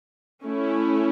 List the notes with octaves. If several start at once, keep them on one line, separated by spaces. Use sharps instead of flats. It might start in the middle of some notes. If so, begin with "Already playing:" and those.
A3 C#4 E4